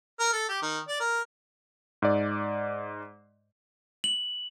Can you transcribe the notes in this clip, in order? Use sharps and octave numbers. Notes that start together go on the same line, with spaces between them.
A#4
A4
G4
D#3
D5
A#4
G#2 D5
F#7